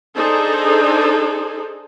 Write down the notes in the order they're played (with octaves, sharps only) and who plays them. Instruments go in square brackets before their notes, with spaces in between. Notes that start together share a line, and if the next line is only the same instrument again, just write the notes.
[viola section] D4 D#4 G#4 A4 C5